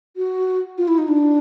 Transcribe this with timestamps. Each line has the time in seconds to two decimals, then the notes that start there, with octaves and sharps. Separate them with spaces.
0.17 F#4
0.78 F4
0.88 E4
0.98 D#4
1.08 D4